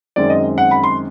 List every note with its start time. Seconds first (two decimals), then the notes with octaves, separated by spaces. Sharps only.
0.16 F#2 D#3 G#3 C4 D5
0.30 D#5
0.58 F#5
0.71 B5
0.84 C6